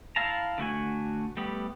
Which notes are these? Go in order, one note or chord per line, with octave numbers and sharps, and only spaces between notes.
E4 F5 A5 A#5
D3 A3 F#4 G#5
G3 A3 B3 G4